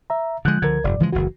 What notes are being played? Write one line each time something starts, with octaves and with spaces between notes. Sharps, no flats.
E5 A#5
D3 F3 G#3 F#6 G6
C#2 D3 F3 A#4 G#6
F1 G2 D5
C#3 E3 F3 G#3
F#1 D2 E3 F#4